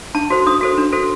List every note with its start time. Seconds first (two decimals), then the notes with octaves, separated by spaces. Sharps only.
0.15 D4 A5
0.30 F#4 A4 C5
0.46 D4 D#6
0.61 F#4 A4 C5
0.78 D4
0.92 F#4 A4 C5